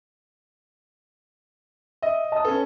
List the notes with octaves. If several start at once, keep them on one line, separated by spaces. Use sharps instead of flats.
D#5 E5
D#5 A5 D#6
C#4 A4 B4